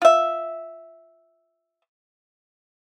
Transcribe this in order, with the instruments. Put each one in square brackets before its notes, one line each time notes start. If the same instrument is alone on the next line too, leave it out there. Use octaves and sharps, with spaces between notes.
[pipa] F4 E5